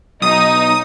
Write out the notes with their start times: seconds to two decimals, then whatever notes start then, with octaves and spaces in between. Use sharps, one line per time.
0.22 B1 D#4 D#6